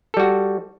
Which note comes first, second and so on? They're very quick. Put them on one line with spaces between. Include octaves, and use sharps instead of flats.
A4 G3 F#4